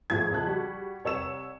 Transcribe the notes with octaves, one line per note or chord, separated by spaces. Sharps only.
G#1 E2 A2 F3 E4 G#6
C#2 F3 A5 F#6
G3 F#4
C2 C#5 E6 E7